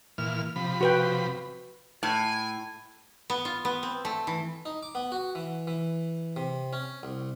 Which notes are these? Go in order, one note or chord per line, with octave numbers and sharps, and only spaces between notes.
A#2 E3 F6
C3 F3 B5
F#4 B4 G5
A2 G#5
B3
F4
B3
C4
A3
E3
D#4
D6
B3
F#4
E3
E3
C3
C#4
C2